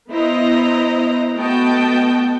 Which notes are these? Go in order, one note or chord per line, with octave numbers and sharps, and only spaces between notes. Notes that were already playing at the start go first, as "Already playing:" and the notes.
B3 E4 C5 D#5 A#5
A3 B3 F#4 D#5 G5 A5